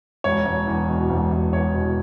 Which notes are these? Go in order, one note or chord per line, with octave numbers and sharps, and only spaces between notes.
E1 C#5
E1
E2
B2
E1
E1
E2 C#5
B2